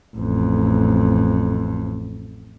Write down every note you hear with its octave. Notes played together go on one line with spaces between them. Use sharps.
A1 F2